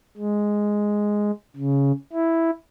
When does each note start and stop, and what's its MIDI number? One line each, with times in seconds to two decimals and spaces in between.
0.17 1.31 56
1.56 1.92 49
2.13 2.51 64